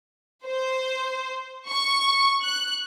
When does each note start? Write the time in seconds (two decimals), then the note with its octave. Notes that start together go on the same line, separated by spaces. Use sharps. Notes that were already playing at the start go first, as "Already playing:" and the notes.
0.45 C5
1.68 C#6
2.42 F#6